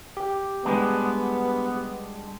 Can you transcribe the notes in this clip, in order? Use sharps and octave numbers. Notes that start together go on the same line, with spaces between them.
G4
G3 G#3 B3 D4